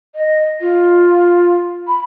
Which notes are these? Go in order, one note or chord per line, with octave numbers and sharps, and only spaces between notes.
D#5
F4
B5